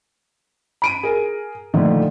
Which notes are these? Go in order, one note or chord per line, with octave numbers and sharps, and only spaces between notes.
B5 D7 D#7
G#4 A#4
A#2 D3 D#3 F3 A3